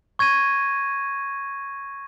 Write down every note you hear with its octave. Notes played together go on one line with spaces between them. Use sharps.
C#6 G#6 A#6 D#7